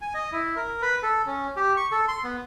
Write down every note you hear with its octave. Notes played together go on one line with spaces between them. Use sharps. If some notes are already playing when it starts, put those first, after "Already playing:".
G#5
D#5
E4
A#4
B4
A4
C#4
G4
C#6
A4
C6
B3